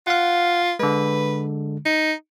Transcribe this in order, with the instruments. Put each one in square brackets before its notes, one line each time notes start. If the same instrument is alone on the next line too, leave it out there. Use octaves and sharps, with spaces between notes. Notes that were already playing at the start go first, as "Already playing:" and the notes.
[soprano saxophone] F4 [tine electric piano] F5 F#5
[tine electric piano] D3 G#3 [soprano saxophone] B4
[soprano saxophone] D#4